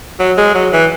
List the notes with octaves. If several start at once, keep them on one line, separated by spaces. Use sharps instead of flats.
F#3
G#3
F#3
E3